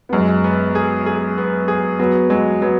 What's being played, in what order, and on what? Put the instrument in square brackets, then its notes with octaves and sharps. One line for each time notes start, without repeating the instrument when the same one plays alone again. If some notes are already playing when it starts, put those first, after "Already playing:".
[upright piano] B3
[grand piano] F#2 [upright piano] G#3
[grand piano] B3
G#4
G#4
B3
G#4
[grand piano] F#3 [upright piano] B3
[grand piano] F#3 [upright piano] G#3
[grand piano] F#3 [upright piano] B3